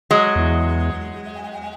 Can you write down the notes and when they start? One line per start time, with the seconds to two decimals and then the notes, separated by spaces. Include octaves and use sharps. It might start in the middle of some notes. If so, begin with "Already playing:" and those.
0.11 F#3 G#3
0.36 E2